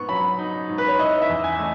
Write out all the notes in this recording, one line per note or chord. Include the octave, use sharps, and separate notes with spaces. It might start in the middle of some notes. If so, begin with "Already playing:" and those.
Already playing: G#2 B3 C#6
F#3 B5
D#4
G#2
B4
C#5
E4 D#5
E5
E2
G#5
A3